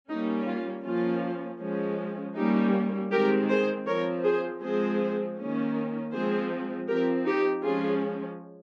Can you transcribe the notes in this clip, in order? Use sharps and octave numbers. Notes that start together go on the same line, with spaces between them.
G3 A#3 C#4 D#4
F4
F3 A#3 C#4 F4
F3 G#3 C#4
G3 A#3 C#4 D#4 G4
D#3 G#3 C4 G4 A#4
G#4 C5
F3 C4 A#4 C#5
G#4 C5
F3 G#3 C4 G#4 C5
D#3 A#3 C#4
F3 G#3 C4 G#4 C5
F3 C4 G4 A#4
D#4 G4
F3 G#3 C#4 F4 G#4